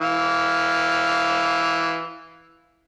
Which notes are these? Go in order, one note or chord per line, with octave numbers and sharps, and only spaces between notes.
E3 F5